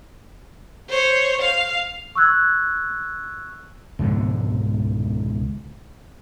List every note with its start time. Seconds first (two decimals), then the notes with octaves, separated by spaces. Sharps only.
0.89 C5 C#5
1.42 F5
2.15 C#6 E6 F#6 G#6
3.99 C#2 G#2 B2 D3